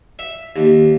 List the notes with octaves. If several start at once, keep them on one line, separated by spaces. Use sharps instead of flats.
E5
D#2